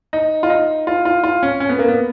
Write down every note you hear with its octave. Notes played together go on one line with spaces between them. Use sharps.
D#4
F4
D#4
F4
F4
F4
C#4
C#4
B3
A#3
B3